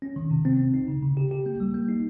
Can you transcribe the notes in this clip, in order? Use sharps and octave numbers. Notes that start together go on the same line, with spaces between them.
C#4
D#3
C3
C4
C4
D#4
C#3
C#3
G4
G4
A#3
G3
A#3
D#4